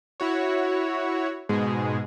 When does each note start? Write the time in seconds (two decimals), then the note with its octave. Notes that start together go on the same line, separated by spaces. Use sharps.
0.20 E4 F#4 C#5
1.49 G#2 B2 G#3 G#4